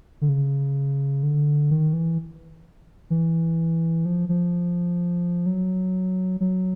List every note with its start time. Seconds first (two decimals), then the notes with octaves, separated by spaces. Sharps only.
0.21 D3
0.29 C#3
1.23 D3
1.70 D#3
1.93 E3
3.10 E3
4.05 F3
4.29 F3
5.46 F#3
6.41 F#3